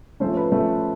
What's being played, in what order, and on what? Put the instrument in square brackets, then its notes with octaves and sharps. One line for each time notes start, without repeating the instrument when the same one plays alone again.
[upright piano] F3 A3 C#4 C5
B4
F3 A3 C#4